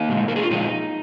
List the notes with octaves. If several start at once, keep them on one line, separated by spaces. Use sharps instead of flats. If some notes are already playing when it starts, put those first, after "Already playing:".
Already playing: A#3 D#4
A#2 F3 G#3
A#4
G#4
F4
A#2 F3 G#3 A#3 D#4